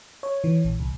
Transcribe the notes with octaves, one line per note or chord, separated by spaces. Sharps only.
C#5
E3
A#1
C2